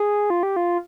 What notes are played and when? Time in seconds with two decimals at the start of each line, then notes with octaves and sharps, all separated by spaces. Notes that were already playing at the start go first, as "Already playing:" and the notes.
Already playing: G#4
0.30 F4
0.43 G4
0.56 F4